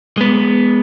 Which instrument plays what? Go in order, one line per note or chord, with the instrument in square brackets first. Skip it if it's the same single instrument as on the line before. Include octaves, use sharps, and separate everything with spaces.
[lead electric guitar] G#3 B3